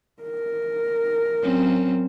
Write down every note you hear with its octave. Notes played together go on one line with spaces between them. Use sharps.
A#4
F#3 C4 C#4